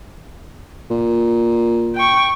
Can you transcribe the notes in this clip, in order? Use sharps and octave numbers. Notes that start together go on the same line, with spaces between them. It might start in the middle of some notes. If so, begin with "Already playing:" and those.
A#2
G5 C#6